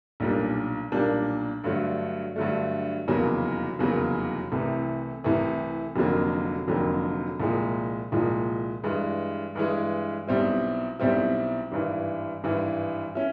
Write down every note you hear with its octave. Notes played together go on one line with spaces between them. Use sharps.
B1 A#2 G3 A#3 D4
B1 A#2 G3 A#3 D4
G2 D3 F#3 A3
G2 D3 F#3 A3
F1 E2 C#3 F#3 A#3
F1 E2 C#3 F#3 A#3
C2 C3 E3 A3
C2 C3 E3 A3
F1 F2 D3 F#3 A#3
F1 F2 D3 F#3 A#3
C2 A#2 F3 G#3
C2 A#2 F3 G#3
G2 E3 G#3
G2 E3 G#3
B1 B2 G3 C4 E4
B1 B2 G3 C4 E4
G#1 G2 E3
G#1 G2 E3
C#4 E4